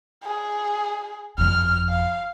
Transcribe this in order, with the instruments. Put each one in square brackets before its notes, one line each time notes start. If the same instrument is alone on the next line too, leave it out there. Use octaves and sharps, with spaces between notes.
[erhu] G#4
[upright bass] G1 F2 [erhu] F6
[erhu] F5